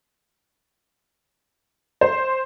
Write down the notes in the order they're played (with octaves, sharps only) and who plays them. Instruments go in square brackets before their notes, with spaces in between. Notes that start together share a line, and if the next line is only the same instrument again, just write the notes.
[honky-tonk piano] C5